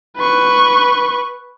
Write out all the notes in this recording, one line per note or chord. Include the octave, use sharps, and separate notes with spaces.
B4 C#6